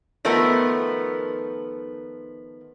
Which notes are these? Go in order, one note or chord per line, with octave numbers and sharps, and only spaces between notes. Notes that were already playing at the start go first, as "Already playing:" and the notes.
D#3 F3 A3 B3 A#4